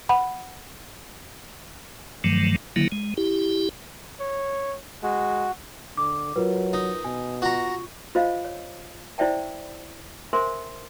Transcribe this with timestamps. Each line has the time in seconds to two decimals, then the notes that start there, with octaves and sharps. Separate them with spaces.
0.09 F#5 B5
2.24 G2 D#3 F3 F#3 A3
2.76 D3 D#3 F#3 A#3 E4
2.92 G#3
3.17 E4 G4
4.20 C#5
5.03 G#3 F#4
5.97 D3 D6
6.36 F#3 F4 A#4 B4
6.73 D#4
7.04 B2 G#5
7.42 F4 F#4 A#5 C#6
8.15 F4 C5 D#5 F5
8.45 C#5
9.18 E4 C5 D5 E5 G5 A5
10.33 A#4 C5 E5 G#5 C6